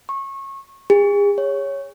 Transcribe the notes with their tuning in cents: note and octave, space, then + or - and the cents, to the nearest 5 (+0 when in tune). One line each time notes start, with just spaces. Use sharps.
C#6 -25
G#4 -40
C#5 +0